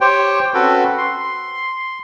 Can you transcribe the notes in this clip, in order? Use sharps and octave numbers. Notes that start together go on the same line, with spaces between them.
G4 C5 C#5 G5
C4 C#4 F#4 A4 B4
C6